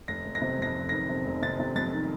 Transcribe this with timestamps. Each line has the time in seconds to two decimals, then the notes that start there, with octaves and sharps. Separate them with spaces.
0.08 F1 A#6
0.25 F1
0.35 A#6
0.42 C3
0.59 F2 A#6
0.75 F1
0.89 D#3 A#6
1.09 C3
1.25 F1
1.42 C3 A6
1.59 C3
1.75 F2 A6
1.93 D#3